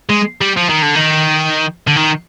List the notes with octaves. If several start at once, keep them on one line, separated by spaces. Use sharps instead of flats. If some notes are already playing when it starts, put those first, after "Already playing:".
G#3
G3
F3
D#3
D3
D#3
D3
D#3